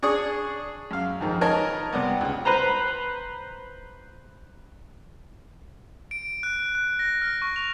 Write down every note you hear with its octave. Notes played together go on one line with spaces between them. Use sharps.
D4 G#4 C#6 D#6
F#2 F5
F2 G#2 D#3
D#4 A#4 B4 C#5 G#5 A5
C3 G3 B3
C#2
B4 C5 A#5
D7
F#6
F#6
A#6
F6
C#6
F7